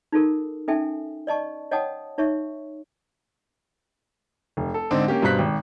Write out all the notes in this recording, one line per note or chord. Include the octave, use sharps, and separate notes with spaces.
D#4 F4 A4 A#4
C#4 D#4 A4 E5 G5 G#5
D5 D#5 A5 C#6
C#5 D#5 F#5 G5 A5 D#6
D#4 C#5 E5 C#6
F1
A4
G#2 D3 C4 D4 D#4
A#3 C#4 G4
G2 B2 C5 A#5 F#6 B6
G#1